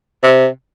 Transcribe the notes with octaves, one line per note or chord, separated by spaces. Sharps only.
C3